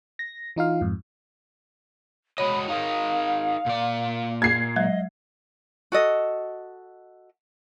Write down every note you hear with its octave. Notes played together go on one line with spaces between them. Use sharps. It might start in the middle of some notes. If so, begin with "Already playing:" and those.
A#6
E3 D#4 F4 F5
F2 G#2
G#3 F#4 C#5 D#5 B5
D#4 G#4 A#4 F5
A#2 D5
G#6 C7
F#3 G#3 D#5
F#4 A4 D#5